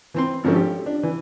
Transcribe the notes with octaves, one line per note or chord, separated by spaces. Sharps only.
E3 C4 C6
G#1 D3 F3 C4 C#4 A4
G4
D4
E3